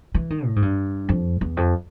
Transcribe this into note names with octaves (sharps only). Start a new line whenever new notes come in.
E3
D#3
A2
G#2
G2
F2
E2
F2